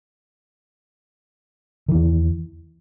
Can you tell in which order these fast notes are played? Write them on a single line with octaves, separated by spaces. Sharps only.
D#3 E3 E2